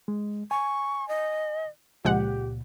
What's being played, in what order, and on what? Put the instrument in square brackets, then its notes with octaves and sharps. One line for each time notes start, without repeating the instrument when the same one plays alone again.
[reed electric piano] G#3
[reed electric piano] G#5 [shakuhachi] C#6
[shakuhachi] D#5
[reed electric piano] C#2 A#2 [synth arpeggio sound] F3 G#3 F#5 [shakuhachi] G4